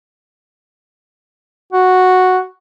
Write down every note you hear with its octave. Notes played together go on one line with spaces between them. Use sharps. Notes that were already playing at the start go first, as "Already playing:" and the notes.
F#4